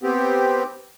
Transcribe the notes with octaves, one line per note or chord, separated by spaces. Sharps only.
B3 C4 G4